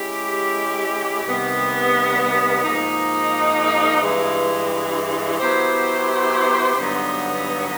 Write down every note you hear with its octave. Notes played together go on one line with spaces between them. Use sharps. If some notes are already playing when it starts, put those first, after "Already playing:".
Already playing: G#3 C#4 E4 G4
C3 D#3 G3 B3
G#2 F3 A#3 D#4
G2 E3 G#3
F#3 B3 E4 G4 C5
G2 D3 F#3 B3 D#4